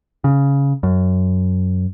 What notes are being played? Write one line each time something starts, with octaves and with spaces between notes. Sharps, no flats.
C#3
F#2